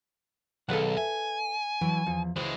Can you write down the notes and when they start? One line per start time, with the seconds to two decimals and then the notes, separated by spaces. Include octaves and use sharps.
0.69 B1 D#3 G#4 A4 B4 F5 F#5
0.97 E5 G#5
1.81 E3 F#3 E4
2.07 E2 F3
2.36 C#2 E3 G#3 C5